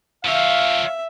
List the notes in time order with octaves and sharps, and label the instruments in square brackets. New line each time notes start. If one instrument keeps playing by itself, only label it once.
[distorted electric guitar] F3 C#5 [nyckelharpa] E5 [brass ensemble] F5